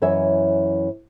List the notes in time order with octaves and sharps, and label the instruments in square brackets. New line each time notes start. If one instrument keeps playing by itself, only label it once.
[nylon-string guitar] F#2 E3 C#5 D#5 E5 G#5